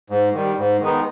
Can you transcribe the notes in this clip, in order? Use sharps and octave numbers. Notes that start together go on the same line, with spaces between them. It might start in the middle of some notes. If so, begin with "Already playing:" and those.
G#2
D#3 G3
G#2
D#3 G#3 B3 D#4